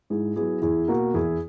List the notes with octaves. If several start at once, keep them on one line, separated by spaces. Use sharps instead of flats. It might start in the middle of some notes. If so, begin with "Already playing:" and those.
G#2 E4 G#4
F#3 B3 E4 G#4
E2 E4 G#4
B2 A#3 F#4 A#4
E2 E4 G#4